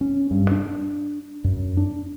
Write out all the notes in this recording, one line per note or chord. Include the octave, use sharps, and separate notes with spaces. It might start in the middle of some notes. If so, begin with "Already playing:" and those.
C#4
G2
D4
F#2
D4